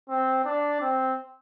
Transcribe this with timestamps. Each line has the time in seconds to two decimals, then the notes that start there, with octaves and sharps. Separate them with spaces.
0.09 C4
0.45 D4
0.81 C4